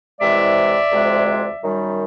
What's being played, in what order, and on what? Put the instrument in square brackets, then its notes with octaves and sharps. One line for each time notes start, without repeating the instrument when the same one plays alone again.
[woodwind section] C2 C3 E3 G#3 D5 E5
D2 C3 F3 G#3
F#2 D#3 G3